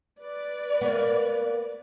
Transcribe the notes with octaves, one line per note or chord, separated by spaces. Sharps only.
B4 D5
A#3 B3